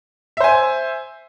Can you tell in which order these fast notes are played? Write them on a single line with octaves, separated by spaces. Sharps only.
E5 C5 G#5